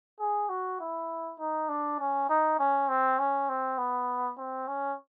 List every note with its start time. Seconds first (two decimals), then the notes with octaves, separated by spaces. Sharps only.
0.19 G#4
0.49 F#4
0.80 E4
1.39 D#4
1.69 D4
2.00 C#4
2.30 D#4
2.59 C#4
2.89 C4
3.19 C#4
3.49 C4
3.78 B3
4.38 C4
4.68 C#4